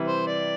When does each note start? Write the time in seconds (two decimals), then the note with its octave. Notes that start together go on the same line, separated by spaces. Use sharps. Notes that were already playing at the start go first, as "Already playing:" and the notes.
Already playing: C3 E3 G3
0.08 C5
0.27 D5